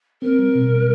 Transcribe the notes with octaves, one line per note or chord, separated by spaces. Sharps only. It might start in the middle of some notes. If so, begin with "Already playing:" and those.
C4 A#4
G3
B2
G3